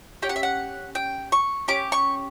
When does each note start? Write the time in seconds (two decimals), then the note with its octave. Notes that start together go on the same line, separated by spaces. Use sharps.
0.22 C#4 G4 G5
0.29 F#5
0.36 E5
0.43 F#5
0.95 G5
1.32 C#6
1.68 C#4 G4 D6
1.92 C#6